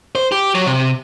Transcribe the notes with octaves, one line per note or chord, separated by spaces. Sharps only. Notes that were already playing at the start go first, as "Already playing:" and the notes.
C5
G4
F#3
C3